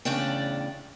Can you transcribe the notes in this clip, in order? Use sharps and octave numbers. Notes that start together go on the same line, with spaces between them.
E2 A2 C#3 D4 D5 G5